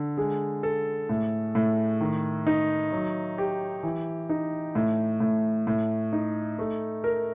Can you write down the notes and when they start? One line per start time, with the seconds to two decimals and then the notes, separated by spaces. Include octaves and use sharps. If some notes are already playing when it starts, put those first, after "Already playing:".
Already playing: D3
0.17 G#3
0.63 A4
1.09 A2
1.55 A2
2.01 D#3
2.47 D#4
2.93 F#3
3.38 G4
3.83 E3
4.29 D#4
4.75 A2
5.20 A2
5.67 A2
6.13 D#4
6.59 A3
7.04 A#4